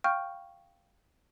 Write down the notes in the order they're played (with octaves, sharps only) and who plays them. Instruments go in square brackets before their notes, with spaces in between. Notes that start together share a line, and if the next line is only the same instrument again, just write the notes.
[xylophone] F5 G5 C#6 F6 G6